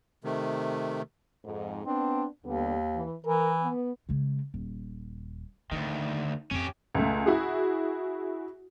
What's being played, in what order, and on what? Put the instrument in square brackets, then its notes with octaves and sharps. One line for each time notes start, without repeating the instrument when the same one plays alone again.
[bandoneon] C3 D#3 A3
[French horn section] F2 G#2
[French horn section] B3 D4 [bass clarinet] C4
[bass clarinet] D#2 [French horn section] D3 G3 B3
[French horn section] E3
[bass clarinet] E3 [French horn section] A#4
[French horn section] B3
[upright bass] C#3 G#3
D#1
[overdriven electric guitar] D2 D#3 [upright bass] D#4
[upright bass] F2 [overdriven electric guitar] C#4 G4
[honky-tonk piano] C#2 A3
E4 F#4 G#4